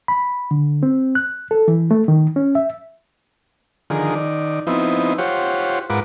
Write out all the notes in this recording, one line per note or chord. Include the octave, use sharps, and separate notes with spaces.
B5
D3
C4
F#6
A4
E3
A3
D#3
C#4
E5
D3 D#3 F3 G#4 A#4
D#3 D5
F3 B3 C4 D#4 E4
F4 G4 C5 C#5 F#5
G#2 F4 A#4 B4 F#5 D6